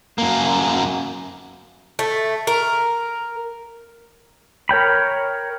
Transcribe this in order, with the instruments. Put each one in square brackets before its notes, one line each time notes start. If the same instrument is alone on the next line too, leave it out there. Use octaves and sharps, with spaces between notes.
[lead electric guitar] F#2 A#3
[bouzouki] A3
A#4
[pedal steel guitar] A#4 C#5 G5 B5